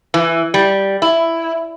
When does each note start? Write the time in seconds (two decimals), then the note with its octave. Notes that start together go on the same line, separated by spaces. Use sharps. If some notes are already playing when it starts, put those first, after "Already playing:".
0.14 E3
0.54 G3
1.02 E4